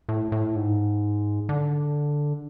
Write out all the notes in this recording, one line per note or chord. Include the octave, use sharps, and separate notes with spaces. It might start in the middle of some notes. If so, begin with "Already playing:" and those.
A2
A2
G#2
D3